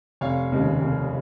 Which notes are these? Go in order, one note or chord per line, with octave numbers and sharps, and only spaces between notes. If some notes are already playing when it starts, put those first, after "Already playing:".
F1 C#5 F5
D#2 C#3 G#3
F1